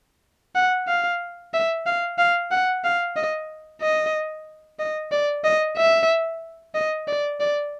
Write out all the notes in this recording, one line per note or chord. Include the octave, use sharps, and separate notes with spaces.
F#5
F5
E5
F5
F5
F#5
F5
D#5
D#5
D#5
D5
D#5
E5
D#5
D5
D5